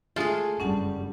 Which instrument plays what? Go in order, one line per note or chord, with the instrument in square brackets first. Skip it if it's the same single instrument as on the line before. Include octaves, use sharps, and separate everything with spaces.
[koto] G#3 F4 [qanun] A3 G#4
[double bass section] F#1 G2 G3 [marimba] C#4 F#5 A5